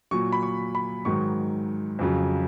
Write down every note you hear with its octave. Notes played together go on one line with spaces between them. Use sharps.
A#2 F#3 C#6
B5
C#6
B5
G#2 D#3 F#3 C#6
F2 C#3 F#3